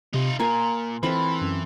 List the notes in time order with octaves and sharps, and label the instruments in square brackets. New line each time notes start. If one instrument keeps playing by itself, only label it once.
[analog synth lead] C3 [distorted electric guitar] D#4 F4
[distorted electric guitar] A#2 [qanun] F4 A#4 G#5 [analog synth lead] A#5
[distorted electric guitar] E3 [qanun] C4 F4 A4 [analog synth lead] B5
[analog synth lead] F#2